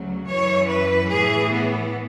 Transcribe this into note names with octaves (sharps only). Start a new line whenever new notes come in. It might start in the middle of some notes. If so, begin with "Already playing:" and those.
Already playing: D2 C#3 F#3
F#2 E3 C#5
B4
A2 E3 G#4
B3